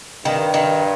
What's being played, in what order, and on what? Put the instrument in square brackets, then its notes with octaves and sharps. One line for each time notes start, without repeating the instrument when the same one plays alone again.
[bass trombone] G2 [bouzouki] D#3
[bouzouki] D#3